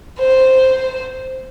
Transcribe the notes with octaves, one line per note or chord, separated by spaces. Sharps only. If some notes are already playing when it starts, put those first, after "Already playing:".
C5